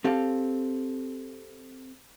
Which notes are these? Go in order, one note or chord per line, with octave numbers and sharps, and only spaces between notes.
C4 G4 A4 F5